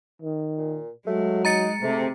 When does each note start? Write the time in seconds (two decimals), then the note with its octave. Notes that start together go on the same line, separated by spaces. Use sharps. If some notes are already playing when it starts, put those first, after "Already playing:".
0.22 D#3
0.57 A#2
1.07 F#3 G#3 A3
1.45 D#4 A#5 A6 C#7
1.82 G#2 C3 A3